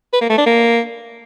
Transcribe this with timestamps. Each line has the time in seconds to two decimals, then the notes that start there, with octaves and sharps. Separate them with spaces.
0.13 B4
0.21 A#3
0.30 A3
0.38 D4
0.46 A#3